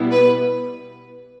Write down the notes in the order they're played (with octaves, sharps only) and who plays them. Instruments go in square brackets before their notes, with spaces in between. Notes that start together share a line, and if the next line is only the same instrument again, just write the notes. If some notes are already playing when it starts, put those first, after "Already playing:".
Already playing: [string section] B2 G3 B3 E4
B4